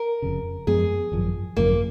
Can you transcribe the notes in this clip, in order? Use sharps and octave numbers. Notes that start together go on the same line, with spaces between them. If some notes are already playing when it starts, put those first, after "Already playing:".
Already playing: A#4
F1 F2 C#3
F#2 F3 G#3 B3 G#4
G#1 F#2 F3
G#1 F#2 C#3 F3 A#3